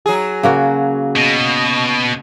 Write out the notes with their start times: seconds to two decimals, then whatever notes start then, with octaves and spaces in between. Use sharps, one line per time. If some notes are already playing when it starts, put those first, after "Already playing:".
0.06 F#3 G#4
0.43 C#3 A#3 F#4
1.16 B2